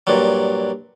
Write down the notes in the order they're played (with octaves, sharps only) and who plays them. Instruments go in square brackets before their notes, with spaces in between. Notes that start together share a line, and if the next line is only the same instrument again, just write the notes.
[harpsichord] G2 A#2 F#3